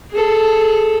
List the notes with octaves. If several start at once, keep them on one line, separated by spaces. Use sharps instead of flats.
G#4 A4